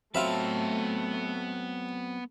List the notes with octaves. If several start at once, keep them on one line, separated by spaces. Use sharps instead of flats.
F#3 A3 B3 C4 F4 E5 A5 B5